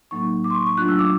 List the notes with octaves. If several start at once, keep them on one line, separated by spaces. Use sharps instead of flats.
A2 F#3 A#3 D#4 C#6
D6
C6
C#6
C#6
F#3 A3 D4 F4 F#6
E6
D6